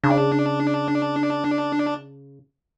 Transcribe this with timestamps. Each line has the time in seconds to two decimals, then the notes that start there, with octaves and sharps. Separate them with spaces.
0.04 C#3 D4